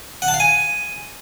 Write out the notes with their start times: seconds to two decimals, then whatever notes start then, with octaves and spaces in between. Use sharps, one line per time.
0.22 F#5
0.28 A5
0.34 F5
0.40 G#5